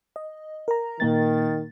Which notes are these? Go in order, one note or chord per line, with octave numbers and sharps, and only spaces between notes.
D#5
A#4 A#5
A#2 D#3 A#3 A6